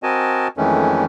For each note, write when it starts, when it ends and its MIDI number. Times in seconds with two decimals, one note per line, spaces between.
0.03 0.48 60
0.03 0.48 66
0.03 0.48 70
0.03 0.48 75
0.03 0.48 80
0.03 0.48 81
0.57 1.05 41
0.57 1.05 51
0.57 1.05 52
0.57 1.05 56
0.57 1.05 57
0.57 1.05 61